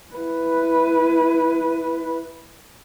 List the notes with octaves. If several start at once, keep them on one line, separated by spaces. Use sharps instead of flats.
E4 B4